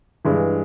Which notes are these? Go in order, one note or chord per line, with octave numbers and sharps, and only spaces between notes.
G2 E3 G#3